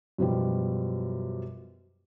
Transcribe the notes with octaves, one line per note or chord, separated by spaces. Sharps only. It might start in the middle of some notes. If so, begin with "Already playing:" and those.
F#2 B2 F3 G3